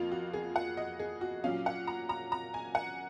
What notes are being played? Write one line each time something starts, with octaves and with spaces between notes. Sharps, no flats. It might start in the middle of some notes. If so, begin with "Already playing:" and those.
Already playing: F2 F3 A#3 F4
F#4
G#4
F#5
D#5
G#4
F#4
A#2 F#3 C#4 F5
F#5
A#5
A#5
A#5
G#5
F#5